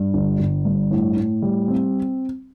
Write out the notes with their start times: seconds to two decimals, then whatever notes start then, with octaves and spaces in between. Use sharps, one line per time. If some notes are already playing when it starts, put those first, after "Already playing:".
Already playing: G2
0.14 G1
0.40 G1
0.65 G2
0.91 A2
1.17 A2
1.42 G3
1.68 C4